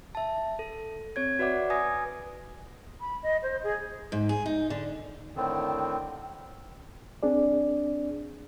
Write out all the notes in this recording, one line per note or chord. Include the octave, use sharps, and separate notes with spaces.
E5 A5
A4
C4 C#5 G#6
F#4 B4 D5 E5 F#5 D6
B4 G#5 D#6 G#6 A#6
B5
D#5
C5
G#4
G#2
G#4
D#4
D3
A2 D3 D#3 C4
C4 D4 G#4 D5